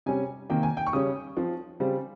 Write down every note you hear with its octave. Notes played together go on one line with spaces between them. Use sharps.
C3 G3 C#4 G#5
C3 D#3 A#3 G5
G#5
G5
C#6
C#3 G3 C#4 D#6
F3 C4
C#3 G3 C4